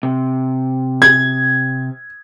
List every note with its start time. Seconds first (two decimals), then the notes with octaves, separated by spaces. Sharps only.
0.03 C3
1.02 G#6